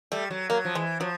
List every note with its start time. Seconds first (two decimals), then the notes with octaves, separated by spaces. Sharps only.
0.12 G3 A3
0.30 F#3
0.50 F#3 A#3
0.65 F3
0.75 E3 G#3
1.00 F3 F#3